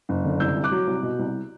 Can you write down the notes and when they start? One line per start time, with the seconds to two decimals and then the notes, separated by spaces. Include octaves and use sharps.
0.09 F#1
0.25 D3
0.40 C2 E6 G6
0.56 C2
0.64 D6 F#6
0.72 F#3
0.87 C2
1.03 B2
1.19 C2